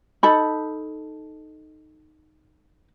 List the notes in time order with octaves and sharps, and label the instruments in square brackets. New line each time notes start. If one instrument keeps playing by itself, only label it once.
[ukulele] D#4 A4 B5